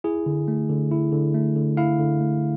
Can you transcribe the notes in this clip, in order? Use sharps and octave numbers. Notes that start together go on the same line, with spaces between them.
E4 G#4
D3
A3
D3
E4
D3
A3
D3
E4 F5
D3
A3